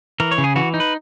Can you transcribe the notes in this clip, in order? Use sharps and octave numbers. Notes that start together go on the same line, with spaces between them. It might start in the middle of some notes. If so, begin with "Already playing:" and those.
E3 A#4
C#5
C#3
G#4
E3 F#4
D#4
B4